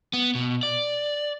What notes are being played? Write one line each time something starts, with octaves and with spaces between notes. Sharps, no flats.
B3
B2
D5